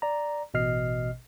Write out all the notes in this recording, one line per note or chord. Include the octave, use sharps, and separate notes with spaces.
D5 A#5
A1 B2 D#5 F6 C7